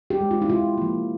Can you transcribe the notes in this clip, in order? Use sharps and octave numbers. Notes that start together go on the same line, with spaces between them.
G4
G#3
F4
E4
C3 F4
F3 A#3